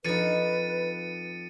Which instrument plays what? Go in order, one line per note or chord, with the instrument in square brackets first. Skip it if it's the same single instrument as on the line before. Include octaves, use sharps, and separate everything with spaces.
[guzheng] F2 D#4 [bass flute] B4 [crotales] A6 C#7 D#7